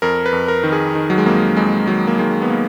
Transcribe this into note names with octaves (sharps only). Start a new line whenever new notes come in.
F2 A#4
B4
F2
A#4
D#3
G#4
D#3
F#3
G#3
F2 A#3
F2 G#3
D#3 F#3
A#3
D#3 G#3
B3
A#3